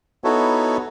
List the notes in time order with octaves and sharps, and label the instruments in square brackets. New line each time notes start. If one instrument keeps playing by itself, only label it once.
[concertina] B3 D#4 E4 F#4 A4 C#5